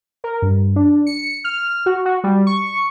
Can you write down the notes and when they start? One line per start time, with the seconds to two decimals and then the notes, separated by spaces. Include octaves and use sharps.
0.24 A#4
0.42 G2
0.76 D4
1.07 C#7
1.44 F6
1.86 F#4
2.05 F#4
2.24 G3
2.47 C#6